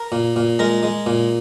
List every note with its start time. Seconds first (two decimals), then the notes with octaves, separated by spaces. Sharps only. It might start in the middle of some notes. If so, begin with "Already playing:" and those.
Already playing: A#4 A#5
0.12 A#2
0.36 A#2
0.59 G#3 A#4 A#5
0.83 G#3
1.06 A#2